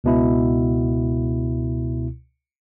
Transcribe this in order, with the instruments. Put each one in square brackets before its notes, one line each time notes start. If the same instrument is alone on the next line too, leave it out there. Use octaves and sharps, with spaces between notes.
[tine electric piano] C#2 B2 E4